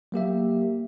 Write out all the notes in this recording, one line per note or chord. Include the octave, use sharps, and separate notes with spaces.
F#3 A#3 G4 E5